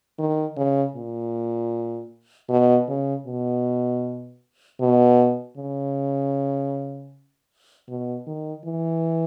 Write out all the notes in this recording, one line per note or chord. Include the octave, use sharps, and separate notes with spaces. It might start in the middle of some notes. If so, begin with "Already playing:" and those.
D#3
C#3
A#2
B2
C#3
B2
B2
C#3
B2
D#3
E3